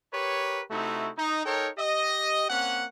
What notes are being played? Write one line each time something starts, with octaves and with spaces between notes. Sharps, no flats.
G4 A#4 B4 C#5
C3 A3 D#4 E4 F#4
D#4
D#4 A4 A#4 C#5 G5
G4 D#5
A#3 C4 C#4 F#5